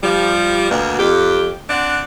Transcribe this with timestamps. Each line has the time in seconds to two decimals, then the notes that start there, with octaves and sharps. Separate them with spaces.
0.03 F3 G3
0.70 D2 B2 A#3
0.99 F2 G4
1.69 C4 D4 F#5